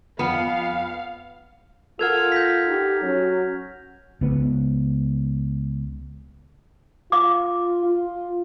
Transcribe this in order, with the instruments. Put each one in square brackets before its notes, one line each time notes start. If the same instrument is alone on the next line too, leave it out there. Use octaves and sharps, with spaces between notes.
[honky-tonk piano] F2 B5 [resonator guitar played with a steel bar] B3 [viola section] F5
[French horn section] F4 [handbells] A4 A#4 F#5 [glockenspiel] F6 G#6 F7
[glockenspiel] G6 A#6 B6
[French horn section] D#4 G4
F#3 C#4
[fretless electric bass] C#2 B3
[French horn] F4 [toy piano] F5 D6
[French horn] F4